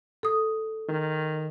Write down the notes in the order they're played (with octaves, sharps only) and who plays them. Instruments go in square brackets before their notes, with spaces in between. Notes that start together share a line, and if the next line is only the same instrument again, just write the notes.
[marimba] A4 D#6
[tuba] D#3